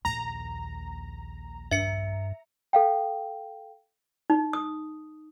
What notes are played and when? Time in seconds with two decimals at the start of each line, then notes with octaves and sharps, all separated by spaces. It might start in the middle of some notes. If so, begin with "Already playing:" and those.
0.05 A#1 D#2 A#5
1.71 G2 E5 C#7
2.73 A4 F5 G5
4.30 D#4
4.53 D#6